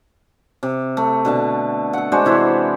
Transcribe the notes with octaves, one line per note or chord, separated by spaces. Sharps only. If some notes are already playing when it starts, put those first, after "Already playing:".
C3
A3
B2 D3 A5
A4 F#5
G#3 D4 F#4 C5
C3 E3 E4 C5